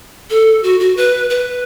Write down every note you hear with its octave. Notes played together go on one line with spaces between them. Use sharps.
A4
F#4
F#4
B4
B4